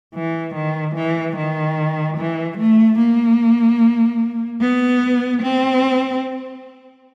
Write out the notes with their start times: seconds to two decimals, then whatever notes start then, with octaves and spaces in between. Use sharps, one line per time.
0.15 E3
0.55 D#3
0.95 E3
1.37 D#3
2.17 E3
2.58 A3
2.99 A#3
4.61 B3
5.42 C4